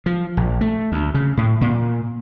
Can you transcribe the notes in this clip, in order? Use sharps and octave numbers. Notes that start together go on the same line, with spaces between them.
F3
A#1
A3
D2
C#3
A2
A#2